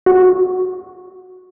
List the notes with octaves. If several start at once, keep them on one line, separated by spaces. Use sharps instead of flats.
F#4